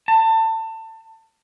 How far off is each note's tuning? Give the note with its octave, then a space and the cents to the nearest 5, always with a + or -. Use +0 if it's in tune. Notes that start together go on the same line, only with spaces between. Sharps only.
A5 +25